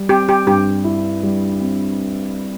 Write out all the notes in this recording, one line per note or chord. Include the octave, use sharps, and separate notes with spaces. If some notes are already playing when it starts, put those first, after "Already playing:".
Already playing: G3
C4 G4
G4
G2 G4
E4
G3
C4